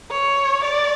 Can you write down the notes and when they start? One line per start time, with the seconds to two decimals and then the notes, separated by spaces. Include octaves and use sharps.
0.11 C#5
0.64 D5